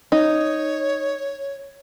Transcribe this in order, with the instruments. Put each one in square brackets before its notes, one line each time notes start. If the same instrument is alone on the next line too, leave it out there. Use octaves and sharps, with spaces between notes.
[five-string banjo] D#4 [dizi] C#5